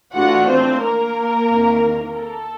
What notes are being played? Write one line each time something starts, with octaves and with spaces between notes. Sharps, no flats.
A2 E3 A3 D4 F4 F#4 F#5
C4 C5
A#3 A#4
E2 C3 D#3
A4